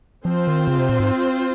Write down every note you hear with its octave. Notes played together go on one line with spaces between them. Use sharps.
F3 C4 F4 C5
D#3
C#3
C3
A#2
G#2